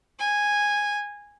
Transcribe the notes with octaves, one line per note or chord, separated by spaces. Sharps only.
G#5